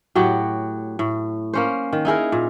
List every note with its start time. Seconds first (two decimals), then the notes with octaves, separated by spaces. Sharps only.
0.15 A2 F#3 F#4 G4
0.99 A2
1.53 A#3 C#4 C5
1.93 D#3
2.05 D#4 E4 G#4 A#4
2.32 A#2